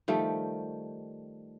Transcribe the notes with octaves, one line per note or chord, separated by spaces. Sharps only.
D#3 F3 G3 A3